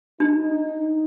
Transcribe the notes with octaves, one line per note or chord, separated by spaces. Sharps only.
D4 D#4